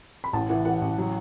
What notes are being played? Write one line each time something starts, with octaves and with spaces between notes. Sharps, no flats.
B5
A1 A5
E3 F#5
E3 F#5
A1
F#3